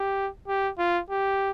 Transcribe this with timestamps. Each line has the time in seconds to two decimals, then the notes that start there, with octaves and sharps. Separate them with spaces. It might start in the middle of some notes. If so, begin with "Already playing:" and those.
Already playing: G4
0.48 G4
0.78 F4
1.10 G4